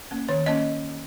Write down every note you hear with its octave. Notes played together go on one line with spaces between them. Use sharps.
A#3 C#4
D#3 C#5
A#3 C#4 D#5